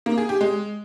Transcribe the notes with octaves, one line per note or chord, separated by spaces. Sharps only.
A#3
G#4
G4
G#3